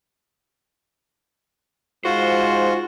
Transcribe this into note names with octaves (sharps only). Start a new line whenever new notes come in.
G#2 F4 F#4 C5